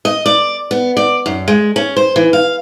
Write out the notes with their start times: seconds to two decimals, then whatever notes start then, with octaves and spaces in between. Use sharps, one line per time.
0.05 D#5
0.26 D5
0.71 B3
0.97 D5
1.26 F#2
1.48 G#3
1.76 C#4
1.97 C5
2.16 E3
2.33 F5